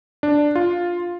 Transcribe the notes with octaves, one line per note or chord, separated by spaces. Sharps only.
D4
F4